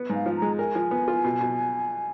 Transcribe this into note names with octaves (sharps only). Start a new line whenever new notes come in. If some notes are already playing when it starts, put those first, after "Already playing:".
Already playing: B3
G#2
F5
F3
A#5
G#3
A#4 G#5
F3
B3
F4
B2
B2